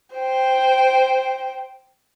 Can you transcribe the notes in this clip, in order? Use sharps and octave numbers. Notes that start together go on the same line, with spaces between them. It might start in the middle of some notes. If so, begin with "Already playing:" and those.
C5 G5